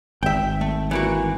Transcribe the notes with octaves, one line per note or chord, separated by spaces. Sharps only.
G#1 E5 G5
A3
E3 A#3 F#4